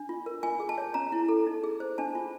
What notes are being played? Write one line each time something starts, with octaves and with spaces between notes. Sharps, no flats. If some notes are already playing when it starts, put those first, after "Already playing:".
Already playing: D4
F4
A#4
F4 G#5
G#4
A5
C#5
C#4 A#5
E4
A4
D#4
G#4
C5
D4 A5
F4